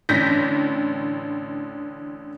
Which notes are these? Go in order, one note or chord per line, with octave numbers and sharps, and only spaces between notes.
A1 D3 G6 A#6 B6